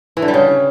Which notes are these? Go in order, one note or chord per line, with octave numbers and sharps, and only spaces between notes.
E3
D3
G3
C#3